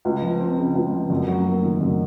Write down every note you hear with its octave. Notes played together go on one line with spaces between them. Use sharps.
C#2
F3
C4
C#3
C#2
F3
F#2
F#3
A#3
D#3
F#2